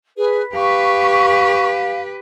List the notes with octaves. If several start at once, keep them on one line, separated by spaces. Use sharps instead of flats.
G#4 B4
G4 B4 F5 C#6